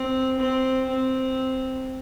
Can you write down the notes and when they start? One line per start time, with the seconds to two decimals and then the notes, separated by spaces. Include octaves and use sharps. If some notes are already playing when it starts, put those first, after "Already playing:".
Already playing: C4
0.39 C4
0.89 C4